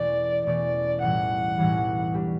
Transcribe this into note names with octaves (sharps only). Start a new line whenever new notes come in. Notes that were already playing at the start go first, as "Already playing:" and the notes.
Already playing: E2 B2 A3 C#4 D5
E2 B2 A3 C#4 D5
B1 A2 E3 G3 F#5
B1 A2 E3 G3
B2 G3 D4 G4